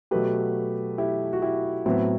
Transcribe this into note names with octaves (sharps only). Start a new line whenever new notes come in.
B2 F#3 A3 G4 B4
E4 G4
F#4
E4 G4
A2 F#3 B3 C4 E4